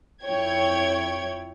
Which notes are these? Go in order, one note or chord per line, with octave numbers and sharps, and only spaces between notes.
F2 E4 C#5 G5 G#6